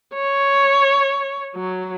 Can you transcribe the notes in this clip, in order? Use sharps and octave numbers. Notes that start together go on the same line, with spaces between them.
C#5
F#3